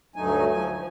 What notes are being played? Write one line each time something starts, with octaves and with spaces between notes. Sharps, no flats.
D2 G2 F#3 A3 D#4 G#5
F3 G#5
F3